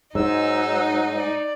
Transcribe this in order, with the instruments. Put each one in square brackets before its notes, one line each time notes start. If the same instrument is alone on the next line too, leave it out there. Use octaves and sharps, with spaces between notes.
[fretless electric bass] G#2 [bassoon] F#3 [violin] D#4 [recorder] E6
[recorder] D5